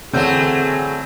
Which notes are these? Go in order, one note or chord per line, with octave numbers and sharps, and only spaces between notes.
D3 E3 F#3 A3 C4 G#4 G6